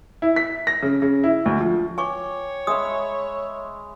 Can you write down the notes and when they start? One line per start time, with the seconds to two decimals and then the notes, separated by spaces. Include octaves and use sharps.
0.22 E4
0.36 B6
0.67 A#6
0.83 C#3
1.02 C#3
1.24 E4
1.46 D2
1.61 F3
1.98 C#5 G5 G#5 C#6 D6
2.67 G#3 E5 B5 D#6